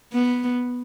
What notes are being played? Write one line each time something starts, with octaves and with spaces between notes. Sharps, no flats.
B3